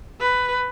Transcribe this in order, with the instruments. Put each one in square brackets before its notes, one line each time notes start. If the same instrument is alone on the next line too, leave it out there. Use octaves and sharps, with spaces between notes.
[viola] B4